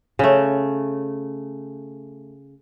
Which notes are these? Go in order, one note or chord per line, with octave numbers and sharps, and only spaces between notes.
C#3 A3